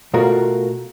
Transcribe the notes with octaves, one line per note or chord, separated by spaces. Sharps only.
B2 A3 F4 F#4 A#4